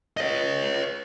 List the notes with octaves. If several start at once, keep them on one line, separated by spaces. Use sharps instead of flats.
C#5 D#5